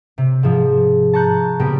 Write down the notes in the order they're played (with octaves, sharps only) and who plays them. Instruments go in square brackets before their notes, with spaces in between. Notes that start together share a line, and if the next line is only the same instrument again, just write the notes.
[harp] C3
G#2 F3
A5 A#5 C#6 F#6 G6
A#2 C#3 G3 B3 G4 A#4